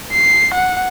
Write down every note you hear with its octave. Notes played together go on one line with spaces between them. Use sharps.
C7
F#5